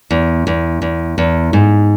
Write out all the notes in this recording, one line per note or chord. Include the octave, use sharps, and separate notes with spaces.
E2
E2
E2
E2
G#2